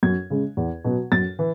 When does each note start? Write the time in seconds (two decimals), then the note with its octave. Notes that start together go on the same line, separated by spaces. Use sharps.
0.03 F#2 G#6
0.30 C#3 G#3
0.57 E2
0.85 B2 F#3
1.12 F#2 A6
1.39 E3